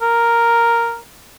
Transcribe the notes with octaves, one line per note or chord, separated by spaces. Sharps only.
A#4